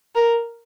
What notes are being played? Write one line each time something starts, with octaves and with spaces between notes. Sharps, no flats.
A#4